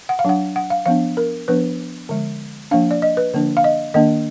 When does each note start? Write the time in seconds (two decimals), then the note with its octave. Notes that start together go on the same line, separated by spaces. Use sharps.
0.09 F#5
0.19 F5
0.25 F#3 D4 F#5
0.56 F#5
0.70 F5
0.86 F3 B3 D4 F5
1.17 A#4
1.48 F3 B3 D4 B4
2.09 D3 F3 G#3
2.71 F3 A#3 D4 F5
2.91 D5
3.02 D#5
3.17 B4
3.34 D3 F3 A#3 D4
3.57 F5
3.64 D#5
3.94 D#3 A#3 D4 D#5